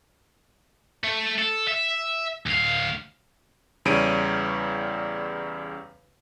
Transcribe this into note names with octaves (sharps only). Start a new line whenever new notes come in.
A3
A4
E5
D2 F5
E2 C#3 G3 C#5 D7 D#7